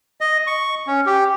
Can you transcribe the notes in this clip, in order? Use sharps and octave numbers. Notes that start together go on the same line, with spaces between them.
D#5
C#6
C#4
G4